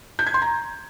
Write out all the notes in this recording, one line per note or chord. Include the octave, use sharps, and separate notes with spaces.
G6
G#6
C6
A#5